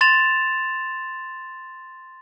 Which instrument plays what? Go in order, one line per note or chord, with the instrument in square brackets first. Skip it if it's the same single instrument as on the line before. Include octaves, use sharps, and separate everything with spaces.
[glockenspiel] C6 A6 E7 F7